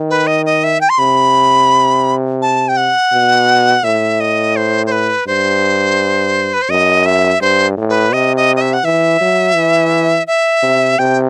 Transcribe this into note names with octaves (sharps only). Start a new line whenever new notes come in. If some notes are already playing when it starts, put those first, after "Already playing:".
Already playing: D#3
B4
D#5
D#5
E5
G5
C6
C3 B5
A5
G5
F#5
B2
A2 E5
D#5
C5
C5
B4
G2 C5
B4
C5
F#2 D#5
E5
G2 C5
A2
B4
C3 D#5
D#5
D#5
E5
F#5
E3 E5
F#3
E3
E5
C3
C3 G5